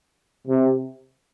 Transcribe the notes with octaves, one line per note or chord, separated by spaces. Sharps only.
C3